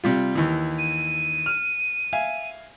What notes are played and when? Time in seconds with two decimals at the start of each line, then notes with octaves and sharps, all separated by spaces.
0.04 C3 G3 F4
0.35 D#2 E3
0.79 D#7
1.46 F6
2.13 E5 F5 G#5